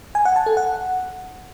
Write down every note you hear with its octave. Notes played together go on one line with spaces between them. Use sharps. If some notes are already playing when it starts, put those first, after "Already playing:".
G#5
F#5
A5
A4
F#5